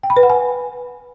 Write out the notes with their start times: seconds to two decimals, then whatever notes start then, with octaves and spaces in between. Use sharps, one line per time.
0.03 G5
0.10 B5
0.17 B4
0.23 F#5
0.30 G#5